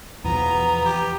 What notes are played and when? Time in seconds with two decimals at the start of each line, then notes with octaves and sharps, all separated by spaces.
0.24 E2 B2 F3 B3 A#5
0.85 G4